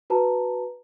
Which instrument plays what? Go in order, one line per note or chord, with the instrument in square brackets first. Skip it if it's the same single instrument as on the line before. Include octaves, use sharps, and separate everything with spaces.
[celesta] F#4 B4 A5 A#5